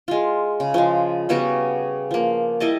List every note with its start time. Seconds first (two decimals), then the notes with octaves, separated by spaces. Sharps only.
0.08 G#3 F4
0.60 C#3
0.74 F3 G#3
1.29 C#3 G3 B3 F#4
2.11 F3 A#3
2.60 G3 E4 D#5 A5